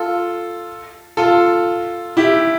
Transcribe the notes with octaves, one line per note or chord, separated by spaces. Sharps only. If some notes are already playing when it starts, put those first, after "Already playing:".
Already playing: F4 A4
F4 A4
E4 G4